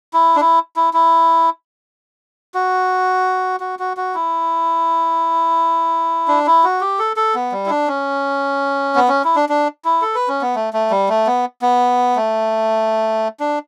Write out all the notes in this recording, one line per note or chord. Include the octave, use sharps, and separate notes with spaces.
E4
D4
E4
E4
E4
F#4
F#4
F#4
F#4
E4
D4
E4
F#4
G4
A4
A4
B3
G3
E4
D4
C#4
B3
C#4
E4
D4
D4
E4
A4
B4
C#4
B3
A3
A3
G3
A3
B3
B3
A3
D4